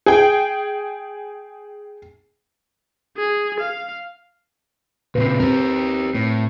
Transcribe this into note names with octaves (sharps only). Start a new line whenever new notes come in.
G#4 G5
G#4
F5
A#2 C#3 C4 B4
C4 G4 A#4
A2